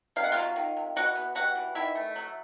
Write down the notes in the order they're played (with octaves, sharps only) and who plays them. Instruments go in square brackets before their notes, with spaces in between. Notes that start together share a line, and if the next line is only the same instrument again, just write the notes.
[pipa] C3 F5
F#5
F#3 F4 F5
D#3
C3
E3 F#4 F#5
B3
G3 F#4 F#5
E3
D#3 E4 E5
A3
F#3